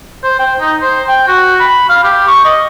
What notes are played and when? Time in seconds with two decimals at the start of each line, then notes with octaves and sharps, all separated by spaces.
0.24 C5
0.39 G5
0.60 D#4
0.81 C5
1.08 G5
1.28 F#4
1.60 B5
1.89 F5
2.04 G4
2.28 C#6
2.45 D#5